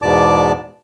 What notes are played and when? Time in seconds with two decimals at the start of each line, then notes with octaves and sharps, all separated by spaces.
0.02 E2 G#2 B2 D5 A5 D6